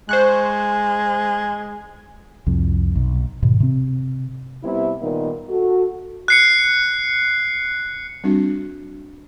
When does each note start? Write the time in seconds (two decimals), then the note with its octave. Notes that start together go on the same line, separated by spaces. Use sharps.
0.09 G#3 C5 C#6 F#6
2.47 C2 F2
2.96 B1
3.42 G#2 B2 D#3
3.60 C3 C4
4.64 C3 G3 B3 E4
5.02 A#2 D#3 G3 A#3 B3 D#4
5.49 F#4 A4
6.28 F#6 C7 C#7
8.24 G3 C4 D4 F#4